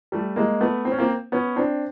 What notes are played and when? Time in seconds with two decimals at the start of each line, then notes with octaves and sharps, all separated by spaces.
0.12 G3 A3
0.36 G#3 A#3
0.61 A3 B3
0.85 C4
0.91 C#4
0.98 A#3 C4
1.32 B3 C#4
1.56 C4 D4